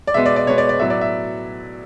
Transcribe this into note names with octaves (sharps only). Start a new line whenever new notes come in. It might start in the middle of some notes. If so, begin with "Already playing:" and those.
D5
B2 G#3 B3 E5
D5
D5
B2 G#3 B3 C#5
D5
D5
A2 F#3 B3 E5
D5
E5